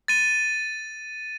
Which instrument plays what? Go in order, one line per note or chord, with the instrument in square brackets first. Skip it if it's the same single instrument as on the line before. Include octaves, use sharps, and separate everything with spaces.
[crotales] A6 D#7